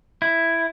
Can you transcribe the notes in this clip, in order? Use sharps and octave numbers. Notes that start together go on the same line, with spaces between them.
E4